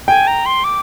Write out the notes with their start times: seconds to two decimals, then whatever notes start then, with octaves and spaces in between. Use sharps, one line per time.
0.07 G5 G#5
0.27 A#5
0.46 C6
0.64 D6